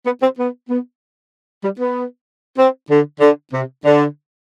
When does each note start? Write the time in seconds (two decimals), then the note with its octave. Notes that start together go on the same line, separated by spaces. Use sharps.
0.05 B3
0.21 C4
0.38 B3
0.69 B3
1.63 G3
1.79 B3
2.57 C4
2.90 D3
3.20 D3
3.52 C3
3.84 D3